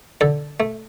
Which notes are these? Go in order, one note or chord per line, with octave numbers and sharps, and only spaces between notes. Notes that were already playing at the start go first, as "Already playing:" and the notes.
D3 A4
A3